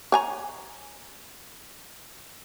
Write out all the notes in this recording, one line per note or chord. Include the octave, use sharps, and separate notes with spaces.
C#5 G#5 A#5